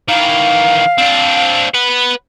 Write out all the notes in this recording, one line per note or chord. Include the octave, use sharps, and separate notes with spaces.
D#3 E3 F5
C4 D4
B4 F#5